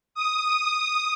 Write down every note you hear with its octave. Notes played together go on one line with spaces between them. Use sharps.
D#6